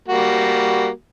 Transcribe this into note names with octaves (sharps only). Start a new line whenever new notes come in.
G3 A#3 F#4